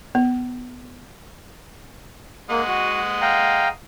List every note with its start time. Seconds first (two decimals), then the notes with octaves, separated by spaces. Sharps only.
0.15 B3
2.50 G#3 A#3 F#5 D#6
2.68 F#4
3.22 F5 G5 A#5